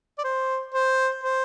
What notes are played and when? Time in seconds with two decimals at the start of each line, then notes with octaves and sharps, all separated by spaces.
0.18 D5
0.24 C5
0.74 C5
1.24 C5